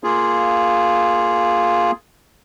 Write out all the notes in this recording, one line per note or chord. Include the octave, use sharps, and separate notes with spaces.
A#3 F4 G#4